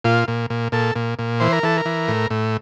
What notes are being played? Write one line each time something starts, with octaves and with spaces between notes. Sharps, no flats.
A#2 F4
A#2
A#2
A#2 A4
A#2
A#2
E3 C5
A#4
E3 A4
A#4
E3
A2
A2